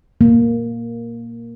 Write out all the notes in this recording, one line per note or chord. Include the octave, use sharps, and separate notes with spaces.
A#3